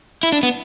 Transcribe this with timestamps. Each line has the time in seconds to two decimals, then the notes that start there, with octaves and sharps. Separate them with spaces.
0.23 E4
0.32 D4
0.43 B3